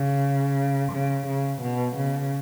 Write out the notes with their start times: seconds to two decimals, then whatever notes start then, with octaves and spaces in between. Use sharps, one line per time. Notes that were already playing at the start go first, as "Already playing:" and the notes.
Already playing: C#3
0.92 C#3
1.27 C#3
1.62 B2
1.96 C#3